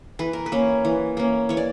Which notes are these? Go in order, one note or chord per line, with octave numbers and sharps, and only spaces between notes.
E3 B4
A#4
B4
A#3 C#4
E3
A#3 C#4
E3 C#5
D5